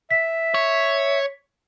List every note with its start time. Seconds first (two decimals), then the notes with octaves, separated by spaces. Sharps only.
0.11 E5 B6
0.54 C#5